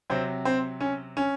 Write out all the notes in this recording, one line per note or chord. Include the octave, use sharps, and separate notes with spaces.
C3 F#3 C4
C4
C#4
C#4